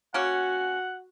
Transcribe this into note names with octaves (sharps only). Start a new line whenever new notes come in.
A#3 C#4 F#4 F#5